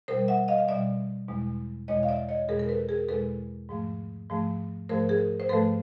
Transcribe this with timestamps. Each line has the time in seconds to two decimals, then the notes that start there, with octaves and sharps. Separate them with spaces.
0.08 B2 G3 A#4 C5
0.28 E5 F#5
0.48 D#5 F5
0.58 F5
0.68 B2 G3 D5 E5
1.28 E2 B2 G#3
1.88 E2 B2 G#3 C#5 D#5
2.03 F5
2.09 D5 E5
2.29 C#5 D#5
2.49 E2 B2 G#3 G#4 A#4
2.59 A#4
2.69 A4 B4
2.89 G#4 A#4
3.09 E2 B2 G#3 A4 B4
3.69 G#2 F3 A3
4.29 G#2 F3 A3
4.89 G#2 F3 A3 A#4 C5
5.09 G#4 A#4
5.40 C5
5.49 G#2 F3 A3 A4 B4